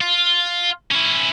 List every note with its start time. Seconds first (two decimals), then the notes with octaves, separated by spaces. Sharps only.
0.01 F4
0.91 C#4 E4